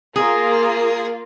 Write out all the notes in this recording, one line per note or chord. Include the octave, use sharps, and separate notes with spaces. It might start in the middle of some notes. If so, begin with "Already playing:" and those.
A#3 F4 G#4